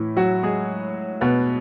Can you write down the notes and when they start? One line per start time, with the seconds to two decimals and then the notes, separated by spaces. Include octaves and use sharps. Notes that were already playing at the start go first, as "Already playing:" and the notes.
Already playing: A2 E3 E4
0.16 F#3 F#4
0.43 G#3 G#4
1.21 B2 B3